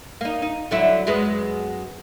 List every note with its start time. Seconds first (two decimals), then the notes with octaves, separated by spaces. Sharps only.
0.21 A#3 D#4
0.42 D#4
0.71 D3 F#3 E4
1.07 F#2 G#3 B3